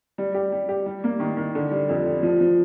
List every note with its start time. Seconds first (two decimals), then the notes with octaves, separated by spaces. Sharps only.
0.18 G3
0.34 G4
0.52 G3
0.69 G4
0.86 G3
1.04 A#3
1.20 D#3
1.37 D#3
1.55 D3
1.71 G3
1.89 F2
2.05 G3
2.23 F3
2.41 F3